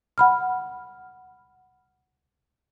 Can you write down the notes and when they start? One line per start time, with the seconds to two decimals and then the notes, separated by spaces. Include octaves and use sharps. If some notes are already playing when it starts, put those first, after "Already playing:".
0.18 F#5 B5 F6